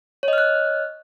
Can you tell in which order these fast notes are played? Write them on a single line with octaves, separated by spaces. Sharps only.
C#5 D#5 F6 F#6